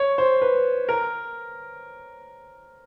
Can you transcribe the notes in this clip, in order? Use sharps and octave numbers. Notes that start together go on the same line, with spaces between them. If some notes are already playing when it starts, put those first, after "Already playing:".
Already playing: C#5
C5
B4
A#4